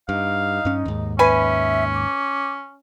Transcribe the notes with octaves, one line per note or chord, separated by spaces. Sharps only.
G2 D#4 F5
G2 C#4
D#2 G#2
C#4 B4 E5 G#5
D6